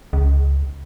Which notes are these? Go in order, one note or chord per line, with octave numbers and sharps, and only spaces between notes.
C#2